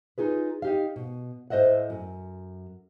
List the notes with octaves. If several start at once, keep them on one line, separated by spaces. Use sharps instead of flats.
D#4 F4 G#4 B4
D#4 G4 F5
B2
A2 C5 D#5 E5 F#5
F#2